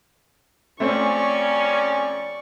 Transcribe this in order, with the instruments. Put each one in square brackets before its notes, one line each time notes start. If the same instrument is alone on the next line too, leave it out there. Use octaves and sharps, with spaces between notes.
[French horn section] F2 C#4 [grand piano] A3 C4 C5 [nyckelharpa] D5 C#6